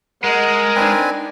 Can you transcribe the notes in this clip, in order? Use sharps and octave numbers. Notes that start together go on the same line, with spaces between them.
G#3 A#4 D#5 F#5
C4 D4 D#4 B4 G#5